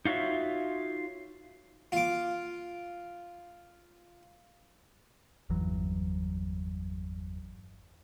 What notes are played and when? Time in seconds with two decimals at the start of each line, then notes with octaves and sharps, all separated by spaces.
0.05 D#4 F4 F#4 C#5 E5
1.92 F4 D6
5.50 G1 E2 E3 F#3